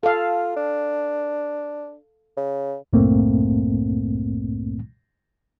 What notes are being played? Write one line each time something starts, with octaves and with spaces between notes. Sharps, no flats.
F4 A4 F5
D4
C#3
C2 F#2 A2 A3 A#3 C4